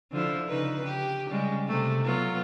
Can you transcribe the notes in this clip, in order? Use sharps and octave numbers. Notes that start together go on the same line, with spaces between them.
D3 F3 E4
C#3 D#4 B4
G4
C#3 G3 G#3
C3 A3
F#3 B3 F4